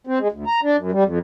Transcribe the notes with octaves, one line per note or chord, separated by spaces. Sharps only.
C4
G#3
D2
A#5
D4
F#2
G3
F2